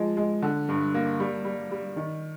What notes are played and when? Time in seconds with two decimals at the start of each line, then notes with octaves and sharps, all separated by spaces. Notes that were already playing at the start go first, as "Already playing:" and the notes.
Already playing: F3 G#3
0.17 G#3
0.42 D3
0.69 G2
0.94 A#3
1.20 G3
1.45 G3
1.71 G3
1.96 D#3